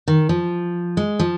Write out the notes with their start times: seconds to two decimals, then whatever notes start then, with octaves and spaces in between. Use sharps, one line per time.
0.08 D#3
0.29 F3
0.97 G#3
1.19 F3